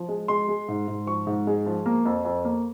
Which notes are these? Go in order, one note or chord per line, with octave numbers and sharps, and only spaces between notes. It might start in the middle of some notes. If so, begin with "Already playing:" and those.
Already playing: F3
G#3
G#3 C6
G#3
G#2
G#2
F3 C#6
G#2
G#3
F3
A#3
F2
F2
A#3